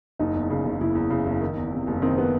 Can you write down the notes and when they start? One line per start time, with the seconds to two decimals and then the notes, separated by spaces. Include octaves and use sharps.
0.19 F#1 D#4
0.34 E2
0.50 C#3
0.65 F#1
0.80 F#1 E4
0.95 E2
1.10 C#3
1.26 F#1
1.41 D#3
1.57 E2
1.72 C3
1.87 F#1
2.02 D#3 C4
2.18 B3